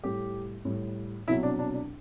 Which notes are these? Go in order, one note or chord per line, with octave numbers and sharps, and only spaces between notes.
A2 G3 G4
A2 G3
C2 B2 F#3 E4
D4
D4
D4